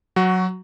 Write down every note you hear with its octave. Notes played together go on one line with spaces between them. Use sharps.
F#3 F#4